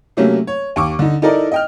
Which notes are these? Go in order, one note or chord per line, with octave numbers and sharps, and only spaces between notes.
C3 F#3 A3 A#3 C#4
C#5
D#2 C#6 D6
D3 D#4
D#4 E4 A4 A#4 D5 D#5
D#5 G5 F6